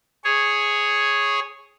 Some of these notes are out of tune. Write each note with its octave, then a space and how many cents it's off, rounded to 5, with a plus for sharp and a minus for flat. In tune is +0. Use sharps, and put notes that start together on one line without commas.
G#4 +0 C#5 -5